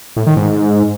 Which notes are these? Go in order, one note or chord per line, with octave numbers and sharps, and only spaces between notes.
A2
D#3
G#2